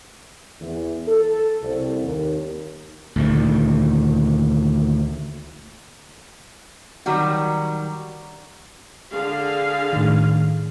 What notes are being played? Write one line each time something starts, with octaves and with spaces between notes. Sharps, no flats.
E2
A4
C2
D#2
D2 A#2 D#3
D#3 F#3 G3 F#4
D3 G#4 F5
A2 D#3